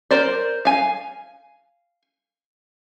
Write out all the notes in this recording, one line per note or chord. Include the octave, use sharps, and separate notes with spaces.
A#4 C5 D5
F5 G#5